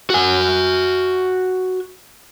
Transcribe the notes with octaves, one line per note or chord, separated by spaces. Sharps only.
F#4 G#5